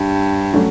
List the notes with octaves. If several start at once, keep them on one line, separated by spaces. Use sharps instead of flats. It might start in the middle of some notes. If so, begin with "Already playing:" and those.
Already playing: G2
F#3 A3 C#4